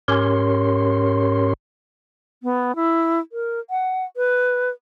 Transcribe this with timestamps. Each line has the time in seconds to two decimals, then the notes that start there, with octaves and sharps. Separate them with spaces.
0.08 G#2 C#4 G4 A#4 C#5 C6
2.43 B3
2.75 E4
3.32 A#4
3.70 F#5
4.17 B4